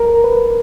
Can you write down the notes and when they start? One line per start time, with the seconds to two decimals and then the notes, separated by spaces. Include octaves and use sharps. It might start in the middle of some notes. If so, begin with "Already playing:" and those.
Already playing: A#4
0.24 B4